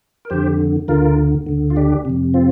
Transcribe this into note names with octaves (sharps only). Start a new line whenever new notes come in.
A#4
F2 D3 G4 C5
D2 D3 F4 A#4
D2 D3
F4
D4 G4
F2 C3
C4 F4